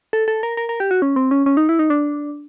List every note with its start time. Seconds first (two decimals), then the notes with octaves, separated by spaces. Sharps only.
0.13 A4
0.28 A4
0.43 A#4
0.57 A#4
0.69 A#4
0.80 G4
0.91 F#4
1.02 C#4
1.16 C4
1.31 C#4
1.46 C#4
1.57 D#4
1.69 E4
1.79 D#4
1.90 D4